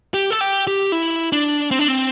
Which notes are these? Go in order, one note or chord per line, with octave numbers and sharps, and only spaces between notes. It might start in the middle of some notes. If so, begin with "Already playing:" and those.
G4
A4
G4
G4
E4
D4
C4
D4
C4